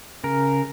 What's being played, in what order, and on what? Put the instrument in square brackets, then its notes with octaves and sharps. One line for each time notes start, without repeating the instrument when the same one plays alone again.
[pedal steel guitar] C#3 A#4